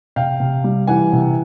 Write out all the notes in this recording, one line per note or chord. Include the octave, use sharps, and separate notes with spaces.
C3 F5 G5
C3
G3
E3 F#5 G#5
C3